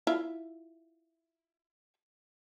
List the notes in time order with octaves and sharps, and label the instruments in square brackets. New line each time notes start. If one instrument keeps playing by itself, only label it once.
[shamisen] E4 F4 E5